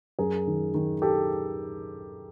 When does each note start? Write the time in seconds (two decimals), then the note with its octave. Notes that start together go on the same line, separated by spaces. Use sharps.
0.19 F#2 G#4 A#4
0.47 D#3
0.74 D#3
1.02 G4 A4